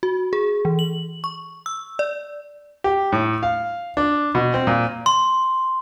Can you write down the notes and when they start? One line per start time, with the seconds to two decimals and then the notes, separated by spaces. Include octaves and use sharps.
0.03 F#4
0.33 G#4
0.65 E3
0.79 F#7
1.24 C#6
1.66 E6
1.99 D5
2.84 G4
3.12 A2
3.43 F5
3.97 D4
4.35 B2
4.54 C4
4.67 A#2
5.06 C6